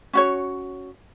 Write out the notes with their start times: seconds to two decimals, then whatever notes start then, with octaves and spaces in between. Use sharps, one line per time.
0.13 C#4 F#4 C#5